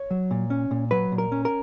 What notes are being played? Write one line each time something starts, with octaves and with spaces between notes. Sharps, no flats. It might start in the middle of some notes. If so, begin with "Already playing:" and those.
Already playing: C#5
F#3
A#2
C#4
A#2
F#3 B4
A#2
A#4
C#4
A#4